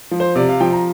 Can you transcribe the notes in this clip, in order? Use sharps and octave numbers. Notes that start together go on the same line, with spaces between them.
F3
C5
C3 D5
F5
F3 G5
A#5